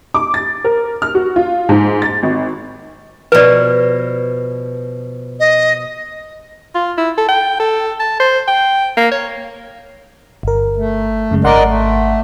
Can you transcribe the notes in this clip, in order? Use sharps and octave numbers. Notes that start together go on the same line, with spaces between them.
D6
A6
A#4
F6
F#4
F4
G#2
A6
G#1
B2 F3 B4 D5
D#5
F4
E4
A4
G5
A4
A5
C5
G5
A#3
C#5
G1 A#4
A3
F#2 C#3 G#3
G#1 A#4 D5 D#5 F#5 C6
A3